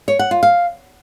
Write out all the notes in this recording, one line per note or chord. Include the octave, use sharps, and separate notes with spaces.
C#5
F#5
F4
F5